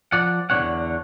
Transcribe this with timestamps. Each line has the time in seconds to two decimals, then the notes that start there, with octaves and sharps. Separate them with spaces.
0.12 F3 D5 F#5
0.50 E2 D3 E3 D4 C#5 F#5